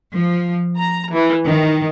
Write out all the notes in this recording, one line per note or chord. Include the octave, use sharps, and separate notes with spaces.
F3
A#5
E3
D#3